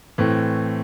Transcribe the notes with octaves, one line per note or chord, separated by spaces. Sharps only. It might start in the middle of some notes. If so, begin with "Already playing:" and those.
A2 E3 A3 C4